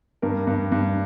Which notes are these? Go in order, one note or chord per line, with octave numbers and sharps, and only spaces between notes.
G2 A#4
G2
G2